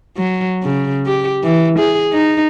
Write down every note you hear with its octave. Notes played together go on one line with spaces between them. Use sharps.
F#3
C#3
G4
E3
G#4
D#4